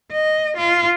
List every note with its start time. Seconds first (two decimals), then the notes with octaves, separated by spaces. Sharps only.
0.12 D#5
0.57 F4